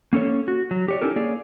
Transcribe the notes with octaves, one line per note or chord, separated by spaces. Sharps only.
A#3 C#4 A4 C#5
F#4
F#3
G4 C#5 D5
C#4 D#4 E4 G4 A4 A#4
A#3 G#4 C#5 D5